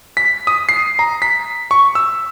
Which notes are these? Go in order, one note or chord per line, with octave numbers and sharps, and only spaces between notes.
B6
D#6
C7
A#5
B6
C#6
E6